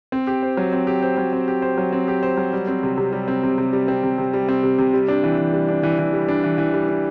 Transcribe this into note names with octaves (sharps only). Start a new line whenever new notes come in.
C4
G4
C5
F#3
C4
G4
C5
F#3
C4
G4
C5
F#3
C4
G4
C5
F#3
G3
C4
C3
C3
G3
C4
C3
C3
G3
C4
C3
C3
G3
C4
C3
C3
G3
D4
E3
E3
G3
D4
E3
E3
G3
D4
E3
E3
G3
D4